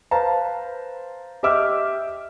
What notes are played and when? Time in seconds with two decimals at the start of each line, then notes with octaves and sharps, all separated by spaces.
0.11 B4 C5 F5 A5 A#5
1.43 G4 D#5 E5 D6 E6 F6